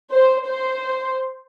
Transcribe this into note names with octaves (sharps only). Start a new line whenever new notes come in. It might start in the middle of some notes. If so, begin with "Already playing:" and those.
C5
C5